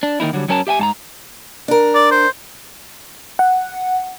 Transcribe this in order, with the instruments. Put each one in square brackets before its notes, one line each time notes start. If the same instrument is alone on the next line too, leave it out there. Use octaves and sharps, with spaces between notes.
[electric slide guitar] D4
D#3 A#3 D#4 E4
D3 F#3 G3
F#2 F#3 C#4 A#4 G#5 A5
G4 E5 G5 G#5
G#2 A5 A#5
[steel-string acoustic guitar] D4 A#4
[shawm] D5
C5
[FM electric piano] F#5